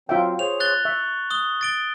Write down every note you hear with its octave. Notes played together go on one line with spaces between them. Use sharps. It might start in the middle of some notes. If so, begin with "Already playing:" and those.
F#3 C4 F4 E5 G5
G#4 C5 C#5 F7
F#6 A6 G7
E5 C#6
D#6 G7
A6 D7 G7